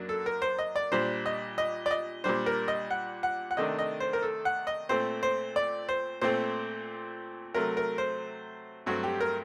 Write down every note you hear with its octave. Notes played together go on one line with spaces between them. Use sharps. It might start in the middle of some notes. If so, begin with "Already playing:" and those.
Already playing: F#2 F#3 A#3 D4
A4
A#4
C5
D#5
D5
A#2 G3 D4 C5
D#5
D#5
D5
D#5
A#2 G3 D4 C5
A#4
D#5
F#5
F#5
F#5
C3 D#3 A3 D4 D#5
D#5
C5
A#4
A4
F#5
D#5
A#2 A3 C4 C5
C5
D5
C5
A#2 A3 C4 C5
C3 F#3 A3 A#4
A#4
C5
G2 F#3 A3 C4 F#4
G4
A#4